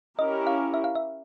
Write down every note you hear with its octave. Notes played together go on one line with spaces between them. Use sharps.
C#4 E4 G4 A#4 D#5
F5
E5
F5
E5